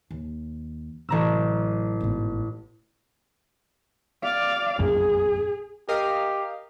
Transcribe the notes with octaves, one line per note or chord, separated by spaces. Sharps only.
D#2
A1 C3 F#3 A#5 E6
G#1 B2
D5 F5
F1 A#1 F#2 G#4
G4 A#4 D#5 F5